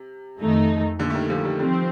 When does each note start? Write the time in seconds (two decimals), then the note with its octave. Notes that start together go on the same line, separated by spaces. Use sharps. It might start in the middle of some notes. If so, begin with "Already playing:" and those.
Already playing: C3
0.39 F2 D#3 A3 D#4
0.99 A#2 D3
1.10 A3
1.14 D#3 G3
1.30 D3 F3
1.45 D#3 G3
1.59 D#3 F3 G3 C4